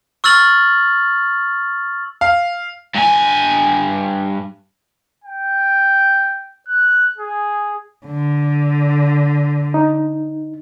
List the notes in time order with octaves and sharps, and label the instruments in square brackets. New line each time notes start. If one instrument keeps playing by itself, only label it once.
[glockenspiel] C#6 E6 F6 A6 F#7
[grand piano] F5
[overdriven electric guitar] G2 G#5
[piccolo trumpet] G5
F#6
G#4
[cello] D3
[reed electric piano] D#4